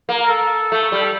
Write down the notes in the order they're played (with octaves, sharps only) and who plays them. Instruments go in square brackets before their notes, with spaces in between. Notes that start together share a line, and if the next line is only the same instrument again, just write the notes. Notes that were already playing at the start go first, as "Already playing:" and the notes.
[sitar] A#3
[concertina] A#4
A4
[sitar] A3
G3
[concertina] A4